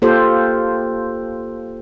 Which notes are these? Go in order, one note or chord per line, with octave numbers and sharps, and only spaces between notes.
A#3 F4 G4 A4 C5